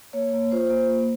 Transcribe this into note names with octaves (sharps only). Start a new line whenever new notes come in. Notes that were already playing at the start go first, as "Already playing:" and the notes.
A#3 C#5
A#3
F4 C5
A#3
A#3